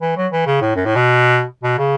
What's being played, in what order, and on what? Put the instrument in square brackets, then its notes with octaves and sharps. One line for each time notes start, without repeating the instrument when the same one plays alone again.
[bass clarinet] E3
F#3
E3
C#3
A2
F#2
A2
B2
B2
C#3